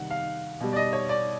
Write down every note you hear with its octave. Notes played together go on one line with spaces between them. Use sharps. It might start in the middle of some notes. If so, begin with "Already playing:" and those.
Already playing: C3 D#3 G3 F#5
F5
B2 G3
D5
D#5
C#5
D5